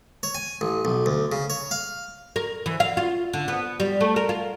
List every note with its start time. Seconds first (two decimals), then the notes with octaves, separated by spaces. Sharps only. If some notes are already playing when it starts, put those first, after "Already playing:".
0.23 C#5
0.35 G#5
0.61 A1
0.85 B1
1.06 D2
1.32 C#3
1.50 C#5
1.71 F5
2.36 A#4
2.66 E3
2.80 F5
2.97 F4
3.33 D3
3.48 B3
3.80 G3
4.01 A3
4.16 A#4
4.29 F4